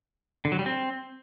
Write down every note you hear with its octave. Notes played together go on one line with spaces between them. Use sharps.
D3
F#3
G3
C4